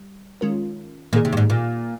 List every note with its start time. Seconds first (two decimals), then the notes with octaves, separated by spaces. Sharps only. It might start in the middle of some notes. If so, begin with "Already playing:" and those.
Already playing: G3
0.41 D#3 G#3 C#4 F4 A#4
1.13 A#2 D#3 A#3 D#4 G#4
1.25 C3
1.33 G2
1.37 G#2
1.50 A#2